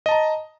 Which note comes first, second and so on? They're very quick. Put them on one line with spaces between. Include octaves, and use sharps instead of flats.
D#5 A5 A#5